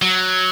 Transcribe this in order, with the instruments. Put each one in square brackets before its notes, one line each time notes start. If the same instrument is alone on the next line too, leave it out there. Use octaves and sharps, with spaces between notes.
[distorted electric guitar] F#3